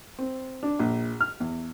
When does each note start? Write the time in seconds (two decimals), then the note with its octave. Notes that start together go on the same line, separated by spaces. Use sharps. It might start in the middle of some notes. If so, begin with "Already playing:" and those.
0.19 C4
0.63 D4
0.79 A#1
1.21 F6
1.40 E2